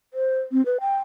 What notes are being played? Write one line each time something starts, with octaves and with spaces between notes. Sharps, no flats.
C5
C4
B4
G5